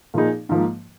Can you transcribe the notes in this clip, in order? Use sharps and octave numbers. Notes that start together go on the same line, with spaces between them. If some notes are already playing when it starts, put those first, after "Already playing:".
A#2 F3 A#3 D#4 G#4
G#2 F3 A#3